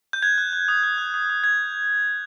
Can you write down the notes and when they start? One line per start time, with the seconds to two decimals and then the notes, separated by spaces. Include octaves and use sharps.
0.13 G6
0.22 F#6 G#6
0.38 F#6
0.53 F#6
0.68 D#6
0.83 F#6
0.98 F#6
1.14 D#6
1.30 D#6
1.44 D#6 G#6